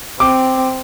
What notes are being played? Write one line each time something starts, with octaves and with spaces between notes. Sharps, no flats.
C4 D6